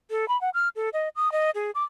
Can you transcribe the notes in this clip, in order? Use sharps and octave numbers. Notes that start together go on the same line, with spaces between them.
A4
B5
F#5
F6
A4
D#5
D#6
D#5
G#4
D6